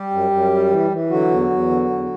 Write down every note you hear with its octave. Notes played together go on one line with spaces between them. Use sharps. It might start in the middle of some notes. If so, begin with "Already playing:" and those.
Already playing: G3 G4
F#2
F#2
G3
E3
E3
D3 F#3 F#4
E2
E2
D3
E2